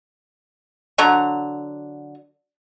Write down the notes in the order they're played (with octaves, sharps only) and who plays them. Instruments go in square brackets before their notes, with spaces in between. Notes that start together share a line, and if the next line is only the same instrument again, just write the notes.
[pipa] D3 F#3 A#5 C#6